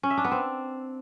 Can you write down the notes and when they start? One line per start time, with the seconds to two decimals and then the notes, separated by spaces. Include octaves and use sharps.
0.03 C#4
0.10 E5
0.17 D4
0.25 B3
0.32 C4